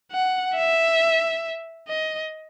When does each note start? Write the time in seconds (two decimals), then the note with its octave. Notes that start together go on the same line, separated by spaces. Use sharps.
0.12 F#5
0.56 E5
1.88 D#5